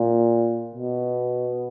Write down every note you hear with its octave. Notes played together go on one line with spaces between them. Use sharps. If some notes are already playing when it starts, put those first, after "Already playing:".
Already playing: A#2
B2